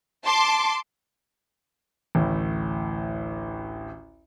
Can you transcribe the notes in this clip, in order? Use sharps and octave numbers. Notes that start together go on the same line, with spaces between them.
A5 C6 D6
A1 D2 A2